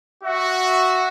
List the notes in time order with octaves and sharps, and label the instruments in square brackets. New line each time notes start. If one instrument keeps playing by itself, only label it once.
[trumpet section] F#4 E5